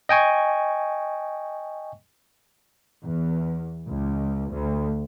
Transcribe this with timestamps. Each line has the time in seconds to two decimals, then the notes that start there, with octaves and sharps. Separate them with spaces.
0.09 D#5 G5 G#5 C#6
3.03 E2
3.86 C#2
4.52 D2